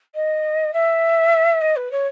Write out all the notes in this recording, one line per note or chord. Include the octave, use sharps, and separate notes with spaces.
D#5
E5
D#5
B4
C#5